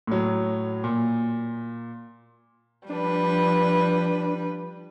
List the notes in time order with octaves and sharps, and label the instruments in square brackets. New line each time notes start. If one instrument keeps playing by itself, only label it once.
[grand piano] A2 F#3
A#2
[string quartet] F3 G3 B4 [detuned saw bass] D4